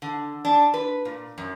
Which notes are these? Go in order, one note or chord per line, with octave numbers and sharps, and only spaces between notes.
D3
D4
B4
A#2
F#2